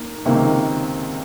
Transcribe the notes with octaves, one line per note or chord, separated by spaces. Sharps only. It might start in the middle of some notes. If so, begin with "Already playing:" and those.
Already playing: A#3 D#4
C#2 C3 D#3 A#3